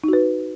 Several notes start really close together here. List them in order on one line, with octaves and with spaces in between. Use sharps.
D#4 F#4 B4